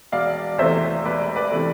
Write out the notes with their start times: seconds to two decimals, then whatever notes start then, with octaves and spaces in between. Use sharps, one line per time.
0.12 E1 D5 F5
0.58 E2 C3 E3 A3 C5 E5
1.05 E1 B4 D5
1.36 B4 D5
1.51 C3 E3 A3